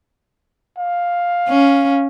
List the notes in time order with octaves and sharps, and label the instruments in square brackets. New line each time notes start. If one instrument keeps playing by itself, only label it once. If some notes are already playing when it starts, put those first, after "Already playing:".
[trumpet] F5
[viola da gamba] C#4